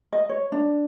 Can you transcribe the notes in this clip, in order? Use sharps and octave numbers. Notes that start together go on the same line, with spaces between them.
D#5
C#5
D4